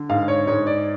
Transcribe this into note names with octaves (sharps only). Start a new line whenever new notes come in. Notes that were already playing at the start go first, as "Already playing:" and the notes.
Already playing: D3
G#2 F5
C#5
G#2 C#5
D5